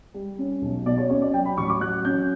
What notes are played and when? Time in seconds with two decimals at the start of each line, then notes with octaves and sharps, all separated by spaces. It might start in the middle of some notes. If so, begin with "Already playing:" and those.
0.14 G3
0.38 C#4
0.62 B1
0.86 B2 D5
0.98 C#5
1.10 C#4 C#5
1.22 D5
1.34 F#3 G5
1.45 B5
1.57 A1 C#6
1.69 D6
1.81 F#3 F#6
2.05 C#4 G6